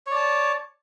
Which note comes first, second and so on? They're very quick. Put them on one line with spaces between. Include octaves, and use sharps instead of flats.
C#5 D5 A5